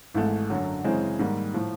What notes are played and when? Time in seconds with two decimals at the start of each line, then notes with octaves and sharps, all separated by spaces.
0.14 G#1 G#2 E3 A3
0.50 F#2 D3 F#3
0.84 F#2 C#3 E3 G#3 C4
1.19 G#2 D#3 G3 A#3
1.54 A2 F3